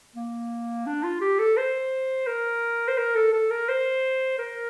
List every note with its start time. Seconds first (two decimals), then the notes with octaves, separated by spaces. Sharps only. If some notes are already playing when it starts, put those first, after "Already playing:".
0.16 A#3
0.86 D4
1.03 F4
1.21 G4
1.39 A4
1.57 C5
2.27 A#4
2.88 C5
2.98 A#4
3.15 A4
3.33 A4
3.50 A#4
3.69 C5
4.39 A#4